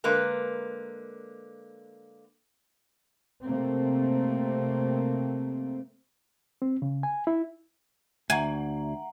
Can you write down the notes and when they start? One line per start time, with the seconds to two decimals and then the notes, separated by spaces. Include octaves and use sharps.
0.04 D3 G#3 A#3 B4 A#5
3.44 C3 A3 A#3 C4
6.62 C4
6.82 C#3
7.03 G#5
7.27 E4
8.30 D2 E5 F#5 G#5 A#5